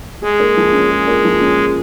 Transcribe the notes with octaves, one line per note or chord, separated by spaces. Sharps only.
G#3 G#4
A#3
F3
C#4
G#4
A#3
F3
C#4
G#4